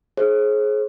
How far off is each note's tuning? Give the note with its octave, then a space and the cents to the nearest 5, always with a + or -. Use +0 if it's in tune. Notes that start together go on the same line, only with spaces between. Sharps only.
G#4 +30 C5 +45